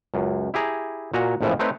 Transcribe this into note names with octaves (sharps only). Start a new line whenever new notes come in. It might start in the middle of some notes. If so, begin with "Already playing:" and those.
C#2 F#2
E4 G4 G#4 A#5
A#2 F#4 G#5 A#5
A#1 F2 A2 C#3 E3 F3
A3 C4 D#4 B4 C#5